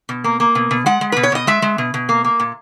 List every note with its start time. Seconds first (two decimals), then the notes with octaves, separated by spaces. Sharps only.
0.09 B2
0.24 A#3
0.40 A#3
0.55 B2
0.71 B2
0.86 G#3 F#5
1.01 G#3
1.12 B2 B4
1.23 C#5
1.32 B2 D#5
1.47 G#3 E5
1.62 G#3
1.78 B2
1.94 B2
2.09 A#3
2.25 A#3
2.40 A#2